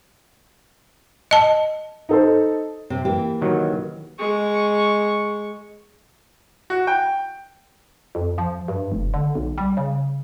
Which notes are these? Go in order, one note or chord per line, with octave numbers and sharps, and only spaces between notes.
D#5 A5
D#4 A4 C5
C3
E3 A#3 G4
D#3 F#3
G#3 C#6
F#4
G5
F2
F3
G2
F1
D3
B1
G3
C#3